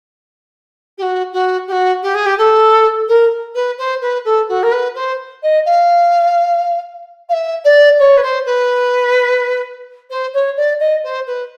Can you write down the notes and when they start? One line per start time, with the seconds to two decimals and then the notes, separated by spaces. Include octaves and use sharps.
0.98 G4
1.02 F#4
1.33 F#4
1.67 G4
1.72 F#4
2.02 G4
2.14 G#4
2.26 G4
2.38 A4
3.08 A#4
3.55 B4
3.78 C5
4.01 B4
4.25 A4
4.49 F#4
4.63 A#4
4.72 B4
4.95 C5
5.43 D#5
5.65 F5
7.29 F5
7.33 E5
7.65 D5
7.99 C#5
8.17 B4
8.23 C5
8.46 B4
10.10 C5
10.34 C#5
10.57 D5
10.80 D#5
11.03 C5
11.27 B4